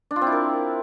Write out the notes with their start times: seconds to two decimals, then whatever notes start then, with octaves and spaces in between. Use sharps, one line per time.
0.11 D4
0.16 F4
0.21 C4
0.27 E4
0.32 A#4